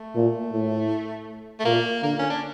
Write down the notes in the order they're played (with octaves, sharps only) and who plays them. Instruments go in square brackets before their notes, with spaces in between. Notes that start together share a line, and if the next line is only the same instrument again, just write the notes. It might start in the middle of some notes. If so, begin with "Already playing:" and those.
Already playing: [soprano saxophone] A3
[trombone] A#2
A2
[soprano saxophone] A3
[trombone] A#2 [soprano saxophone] A#3
[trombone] D3 [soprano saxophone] A#3
[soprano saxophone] C#4
D4